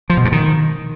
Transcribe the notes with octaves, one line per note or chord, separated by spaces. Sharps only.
F3
B2
G2
D#3